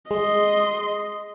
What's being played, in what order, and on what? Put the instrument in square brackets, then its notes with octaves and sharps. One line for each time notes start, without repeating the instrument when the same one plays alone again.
[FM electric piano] G#3 [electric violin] D#5 C6